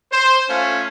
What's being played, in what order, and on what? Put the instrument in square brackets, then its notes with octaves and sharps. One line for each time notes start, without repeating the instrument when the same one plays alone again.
[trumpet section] C5
A3 C#4 F4 F5